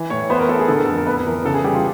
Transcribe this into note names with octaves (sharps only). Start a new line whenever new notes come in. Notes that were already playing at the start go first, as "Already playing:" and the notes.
Already playing: E3
A2 C#5
B3 C5
A#4
B3 A4
G#4
D3 A4
A#4
F2 A4
A#4
B3 B4
E3 A#4
C#3 A4
G#4
G3 G4
F4